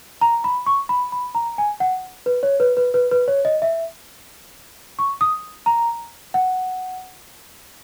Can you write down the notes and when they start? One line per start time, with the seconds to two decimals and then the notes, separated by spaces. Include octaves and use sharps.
0.21 A#5
0.44 B5
0.66 C#6
0.89 B5
1.12 B5
1.35 A#5
1.58 G#5
1.80 F#5
2.26 B4
2.43 C#5
2.60 B4
2.77 B4
2.94 B4
3.11 B4
3.28 C#5
3.45 D#5
3.62 E5
4.99 C#6
5.21 D#6
5.66 A#5
6.34 F#5